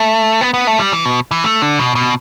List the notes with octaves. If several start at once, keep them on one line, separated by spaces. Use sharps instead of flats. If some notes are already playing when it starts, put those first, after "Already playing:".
Already playing: A3
B3
B3
A3
G3
E3
B2
E3
A3
D3
B2
B2